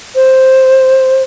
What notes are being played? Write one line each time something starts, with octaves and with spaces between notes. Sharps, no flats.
C5